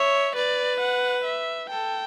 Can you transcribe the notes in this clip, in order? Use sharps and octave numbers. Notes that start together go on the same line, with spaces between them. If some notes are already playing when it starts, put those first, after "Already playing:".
Already playing: C#5 E5
B4 D5
F#5
E5
A4 G5